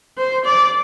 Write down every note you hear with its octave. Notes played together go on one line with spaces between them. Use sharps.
C5
D5